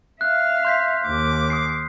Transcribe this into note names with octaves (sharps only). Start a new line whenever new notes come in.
E5 F5 F6 F#6
C6 G6 B6
D#2 D6
D#6 C7